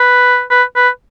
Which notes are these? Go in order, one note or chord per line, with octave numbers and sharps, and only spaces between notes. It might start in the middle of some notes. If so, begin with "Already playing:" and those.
Already playing: B4
B4
B4